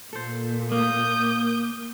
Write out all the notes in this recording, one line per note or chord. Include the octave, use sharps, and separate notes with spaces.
A#2 A4 C5
A#3 D#6 G6